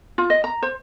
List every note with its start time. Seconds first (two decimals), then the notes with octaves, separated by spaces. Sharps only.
0.18 F4
0.30 D#5
0.44 A#5
0.63 C5